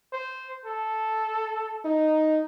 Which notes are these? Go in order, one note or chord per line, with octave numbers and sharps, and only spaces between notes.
C5
A4
D#4